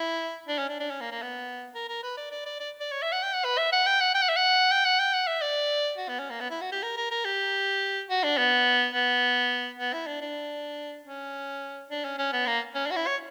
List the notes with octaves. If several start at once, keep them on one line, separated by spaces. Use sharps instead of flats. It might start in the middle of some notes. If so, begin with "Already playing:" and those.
Already playing: E4
D4
C#4
D4
D4
C#4
A#3
A#3
B3
A#4
A#4
B4
D5
D5
D5
D5
D5
C#5
E5
F#5
G5
F#5
B4
E5
F#5
G5
F#5
G5
F#5
E5
F#5
G5
F#5
G5
F#5
E5
D5
F#4
B3
C#4
A#3
B3
E4
F#4
G4
A#4
A#4
A#4
G4
F#4
D4
B3
B3
B3
E4
D4
D4
C#4
D4
C#4
C#4
B3
A#3
C#4
D4
F#4
E4
C#5